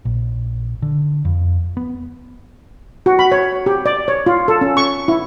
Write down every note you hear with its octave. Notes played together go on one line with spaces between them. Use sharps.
A#1
D3
F2
B3
F#4
B5
C#5
G4
D5
C#5
F4
A4
C#4
C#6
E4